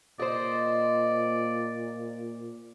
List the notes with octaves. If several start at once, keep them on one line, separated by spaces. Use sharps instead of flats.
A#2 C5 D5 D#5